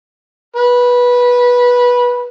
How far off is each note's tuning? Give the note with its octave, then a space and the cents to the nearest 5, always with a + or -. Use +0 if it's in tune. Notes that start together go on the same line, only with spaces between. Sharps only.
B4 -15